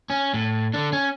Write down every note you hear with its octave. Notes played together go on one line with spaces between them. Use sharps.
C#4
A2
D3 D4
C#4